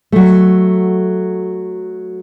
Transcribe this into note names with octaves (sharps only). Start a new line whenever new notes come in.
F#3 A3